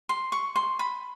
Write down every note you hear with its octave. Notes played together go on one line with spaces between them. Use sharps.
C6
C#6
C6
B5